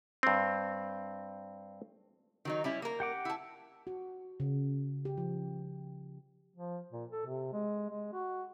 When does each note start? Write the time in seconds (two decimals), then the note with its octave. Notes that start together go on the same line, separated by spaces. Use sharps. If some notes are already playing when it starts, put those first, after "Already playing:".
0.23 G2 C4
2.45 D#3 F#3 D#4
2.64 G3 C#4 E4
2.82 A#3 A#4
3.00 G4 F#5 D6
3.25 E4 A5
3.87 F#4
4.40 C#3
5.05 G4
5.17 F3
6.56 F3
6.92 A#2
7.11 A4
7.26 C3
7.53 G#3
7.90 G#3
8.13 F#4